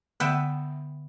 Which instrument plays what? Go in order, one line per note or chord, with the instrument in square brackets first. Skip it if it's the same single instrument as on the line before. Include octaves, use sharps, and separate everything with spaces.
[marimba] D3 [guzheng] B3 E5 G5